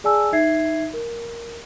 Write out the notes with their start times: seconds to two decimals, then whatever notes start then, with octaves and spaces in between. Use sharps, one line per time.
0.04 G#4 D5 G#5 A5 E6
0.33 D#4 E5 G#6 C7
0.93 A#4